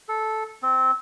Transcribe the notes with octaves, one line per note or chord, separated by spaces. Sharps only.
A4
C4